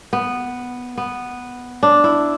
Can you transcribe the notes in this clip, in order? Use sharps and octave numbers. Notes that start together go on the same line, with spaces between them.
B3
B3
D4
E4